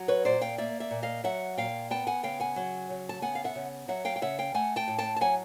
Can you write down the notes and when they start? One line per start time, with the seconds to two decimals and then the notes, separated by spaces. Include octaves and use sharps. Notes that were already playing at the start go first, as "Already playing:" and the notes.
Already playing: F#3
0.08 B4 C#5
0.25 A#2 C5 D5
0.41 F5 G5
0.58 A#3 D5 E5
0.80 D5 E5
0.91 A#2
1.02 D#5 F5
1.24 F#3 E5 F#5
1.57 A#2 F5 G5
1.90 B3 G5 A5
2.07 F#5 G#5
2.23 C#3 F5 G5
2.40 F#5 G#5
2.56 F#3
2.90 C#3
3.09 A5
3.22 B3 F#5 G#5
3.35 F5
3.44 E5 F#5
3.55 C#3
3.88 F#3 E5 F#5
4.05 F5 G5
4.16 G5
4.22 C#3 E5 F#5
4.38 F5 G5
4.54 A3 F#5 G#5
4.76 G5 A5
4.88 A2
4.99 G5 A5
5.17 A5
5.21 F#3 F#5 G#5